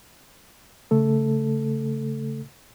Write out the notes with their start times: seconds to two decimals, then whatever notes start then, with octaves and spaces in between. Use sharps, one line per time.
0.91 C#3 A3 A4